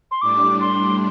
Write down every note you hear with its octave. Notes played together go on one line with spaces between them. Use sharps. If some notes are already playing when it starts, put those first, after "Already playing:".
C6
A2 G3 D4 D6
C6